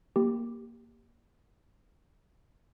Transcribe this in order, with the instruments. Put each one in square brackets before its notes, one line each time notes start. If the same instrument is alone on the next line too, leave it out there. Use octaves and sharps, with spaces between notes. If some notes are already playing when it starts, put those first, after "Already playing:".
[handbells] A#3 G4